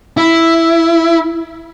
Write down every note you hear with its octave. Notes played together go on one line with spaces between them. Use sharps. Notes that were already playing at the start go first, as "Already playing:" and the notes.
E4